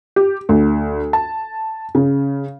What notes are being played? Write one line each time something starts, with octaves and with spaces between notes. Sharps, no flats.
G4
D2
A5
C#3